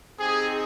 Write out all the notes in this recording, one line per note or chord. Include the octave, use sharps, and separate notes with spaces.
C4 D#4 G4 G#4